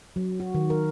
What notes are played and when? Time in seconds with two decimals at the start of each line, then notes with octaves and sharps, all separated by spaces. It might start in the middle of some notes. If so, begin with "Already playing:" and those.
0.16 F#3
0.40 F#4
0.54 D#3
0.70 A#4